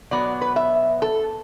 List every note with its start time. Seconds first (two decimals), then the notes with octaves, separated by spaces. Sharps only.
0.11 B2 F#3 B3 D5
0.41 B4
0.56 E5
1.02 A4